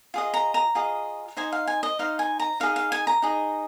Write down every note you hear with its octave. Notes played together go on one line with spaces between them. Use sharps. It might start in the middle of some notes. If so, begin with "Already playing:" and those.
F4 G#4 D#5
A#5
A#5
F4 G#4 D#5
D#4 C5 D#5 G#5
F5
G#5
D#5
D#4 C5 D#5 F5
G#5
A#5
D#4 G#4 D#5 F5
F5
G#5
A#5
D#4 G#4 D#5